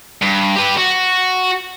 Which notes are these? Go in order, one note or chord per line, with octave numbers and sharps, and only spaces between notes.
G2
G4 B4
F#4